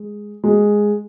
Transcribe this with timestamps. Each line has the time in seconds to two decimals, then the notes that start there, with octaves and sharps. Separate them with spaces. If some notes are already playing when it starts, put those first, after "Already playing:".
Already playing: G#3
0.44 G#3